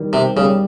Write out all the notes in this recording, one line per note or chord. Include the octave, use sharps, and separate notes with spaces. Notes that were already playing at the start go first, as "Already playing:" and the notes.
Already playing: D#3 G3
C3
C#3 G3